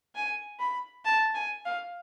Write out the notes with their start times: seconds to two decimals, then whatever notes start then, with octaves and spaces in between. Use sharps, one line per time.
0.15 G#5
0.60 B5
1.05 A5
1.34 G#5
1.65 F5